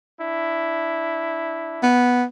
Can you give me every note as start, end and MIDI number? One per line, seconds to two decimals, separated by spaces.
0.21 1.88 62
0.21 1.88 64
1.83 2.24 59